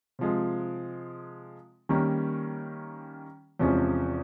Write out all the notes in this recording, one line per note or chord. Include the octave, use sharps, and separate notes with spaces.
C3 F3 G#3
D#3 G3 A#3 C#4
E2 C3 F3 G#3 C#4